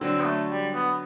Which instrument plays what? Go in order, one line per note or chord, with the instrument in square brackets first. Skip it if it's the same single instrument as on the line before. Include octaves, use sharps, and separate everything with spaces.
[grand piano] D3 F#3 [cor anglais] C4
[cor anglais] B3
A3
G3
B3